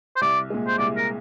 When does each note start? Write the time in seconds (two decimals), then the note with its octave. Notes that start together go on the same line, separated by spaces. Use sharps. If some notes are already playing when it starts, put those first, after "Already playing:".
0.16 C5
0.21 C2 D5
0.50 A#2 G#3
0.67 C5
0.79 C2 D5
0.97 A#4